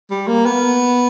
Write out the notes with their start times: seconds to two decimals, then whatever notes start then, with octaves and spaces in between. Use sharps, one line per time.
0.11 G3
0.28 A#3
0.46 B3